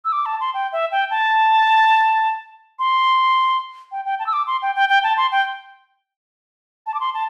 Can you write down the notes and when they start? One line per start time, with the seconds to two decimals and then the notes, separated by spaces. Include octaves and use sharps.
0.05 E6
0.12 D6
0.26 A5
0.41 C6
0.54 G5
0.73 E5
0.92 G5
1.11 A5
2.79 C6
3.92 G5
4.05 G5
4.19 A5
4.27 E6
4.33 D6
4.47 C6
4.62 G5
4.75 G5
4.89 G5
5.03 A5
5.17 C6
5.32 G5
6.87 A5
6.94 D6
7.00 C6
7.14 A5